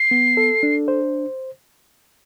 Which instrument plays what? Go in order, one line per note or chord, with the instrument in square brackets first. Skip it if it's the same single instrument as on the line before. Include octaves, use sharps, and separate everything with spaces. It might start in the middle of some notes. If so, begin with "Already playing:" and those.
Already playing: [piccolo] C7
[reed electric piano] B3
A4
D4
C5